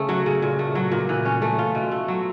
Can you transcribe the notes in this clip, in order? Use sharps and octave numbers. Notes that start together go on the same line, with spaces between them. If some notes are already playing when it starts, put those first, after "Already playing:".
Already playing: C#3 A3 C#4
F#3
C#3
A#2
A3
F#3
A#2
E3
C#4
A3
F4
B2
A3
F#3